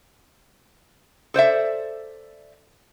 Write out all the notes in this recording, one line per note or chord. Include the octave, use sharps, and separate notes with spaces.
A4 C5 D5 E5